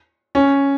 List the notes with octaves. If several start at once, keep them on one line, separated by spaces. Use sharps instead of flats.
C#4